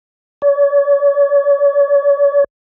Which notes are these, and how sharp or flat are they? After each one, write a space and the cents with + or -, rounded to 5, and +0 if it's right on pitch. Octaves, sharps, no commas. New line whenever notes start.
C#5 +40